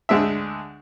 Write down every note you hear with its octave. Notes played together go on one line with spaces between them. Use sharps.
D2 D3 G#3 D4 E5